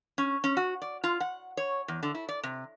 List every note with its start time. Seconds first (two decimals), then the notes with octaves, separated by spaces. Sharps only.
0.18 C#4
0.44 C#4
0.57 F#4
0.82 D5
1.04 F4
1.20 F#5
1.57 C#5
1.88 E2
2.03 D3
2.15 E4
2.29 D5
2.43 C3